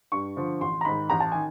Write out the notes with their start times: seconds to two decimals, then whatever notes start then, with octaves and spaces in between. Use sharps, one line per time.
0.12 G2 C#6
0.36 D3 F3
0.61 A1 C6
0.81 A#5
0.85 G#2 D#3 B5
1.10 A1 A#5
1.20 A5
1.32 D#3 G#5